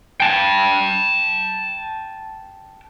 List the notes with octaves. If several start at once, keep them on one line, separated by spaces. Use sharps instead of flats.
G5 A5